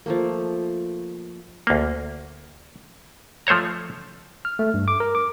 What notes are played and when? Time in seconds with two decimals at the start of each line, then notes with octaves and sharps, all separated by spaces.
0.06 F3 A3 A#3
1.67 D2 A#3
3.47 F3 A3 C5 C#5 A#5
4.45 F6
4.59 A3
4.74 G2
4.88 D6
5.00 A#4
5.15 D6